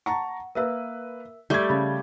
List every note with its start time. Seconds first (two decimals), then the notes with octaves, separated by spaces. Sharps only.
0.06 F#5 A5 A#5 C#6
0.55 A#3 A#4 B4 E5 E6
1.50 G3 A3 G6 G#6
1.70 C#3 B5 A6